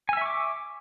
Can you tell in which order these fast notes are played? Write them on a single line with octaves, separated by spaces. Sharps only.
G#5 E6 E5 C#6 D6